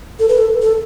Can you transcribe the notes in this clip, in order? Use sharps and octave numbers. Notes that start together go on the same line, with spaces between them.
A4
B4
A4
A4